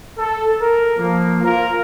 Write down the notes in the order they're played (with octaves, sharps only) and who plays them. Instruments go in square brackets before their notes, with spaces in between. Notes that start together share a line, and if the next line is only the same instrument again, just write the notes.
[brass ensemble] A4
A#4
F3 A#3
F4 A#4